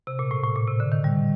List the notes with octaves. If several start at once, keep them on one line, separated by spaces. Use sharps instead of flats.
C3
A#2
A2
A2
A#2
C3
D3
D#3
G3